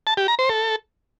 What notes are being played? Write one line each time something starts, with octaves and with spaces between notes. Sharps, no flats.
A5
G4
A#5
C5
A4